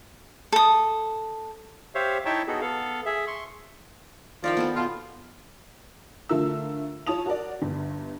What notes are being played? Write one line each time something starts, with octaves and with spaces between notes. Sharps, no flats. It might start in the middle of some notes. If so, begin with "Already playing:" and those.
A4 D#6
G4 C5 C#5 E5 F5
D#4 E4 C#5 E5 G5 A5
B3 D#4 F#4 G#4 A4
B3 A4 F5
G#4 E5
C6 C#6
D#3 F3 D5 F5 G5
B3 A4 B4
B2 F4
D3 A3 F4 A#4 E6
F4 C#5 A5 D#6 F7
F#4 A#4 D5
G1 G2